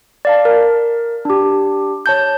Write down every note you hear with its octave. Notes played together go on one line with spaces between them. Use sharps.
D5 F5 A5
A#4
D4 G4
C#5 A5 G6